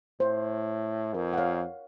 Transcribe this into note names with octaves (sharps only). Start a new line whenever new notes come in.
A2 C5
F2 A#4
F#5
C#5 F5